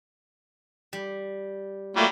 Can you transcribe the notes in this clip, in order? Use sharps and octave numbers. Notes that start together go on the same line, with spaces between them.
G3
F#3 G3 A3 A#3 F4